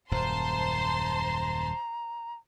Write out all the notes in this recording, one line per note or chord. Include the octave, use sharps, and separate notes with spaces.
D#1 F#2 C5 A5 A#5 C6